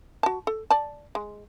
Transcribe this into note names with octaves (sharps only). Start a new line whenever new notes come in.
F#4 A5
A4
D5 A5
G#3